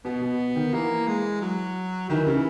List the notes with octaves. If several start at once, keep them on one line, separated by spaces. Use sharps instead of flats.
B2 B3
B2
D#3
E3 A#3
G#3
F#3
D#3 E3
C#3